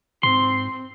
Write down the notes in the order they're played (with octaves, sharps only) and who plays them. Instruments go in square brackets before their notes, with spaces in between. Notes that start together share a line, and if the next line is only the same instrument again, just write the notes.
[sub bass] G#2 [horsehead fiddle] C4 [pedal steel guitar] C6